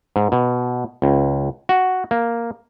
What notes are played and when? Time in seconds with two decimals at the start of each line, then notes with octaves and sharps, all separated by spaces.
0.16 G#2
0.32 B2
1.02 C#2
1.69 F#4
2.11 A#3